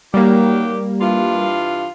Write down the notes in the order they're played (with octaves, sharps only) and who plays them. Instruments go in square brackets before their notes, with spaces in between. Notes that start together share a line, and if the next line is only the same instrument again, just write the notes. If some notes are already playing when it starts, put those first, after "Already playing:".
[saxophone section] D#3 F#3 G4 [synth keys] G3 A#3
[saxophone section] G2 E3 F4